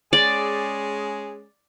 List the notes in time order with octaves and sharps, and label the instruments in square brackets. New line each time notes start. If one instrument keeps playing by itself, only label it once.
[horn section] G#3 C#4 G#4 [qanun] D5